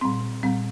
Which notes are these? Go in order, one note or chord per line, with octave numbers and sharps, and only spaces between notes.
A#2 G3 C4 C6
A#2 G3 C4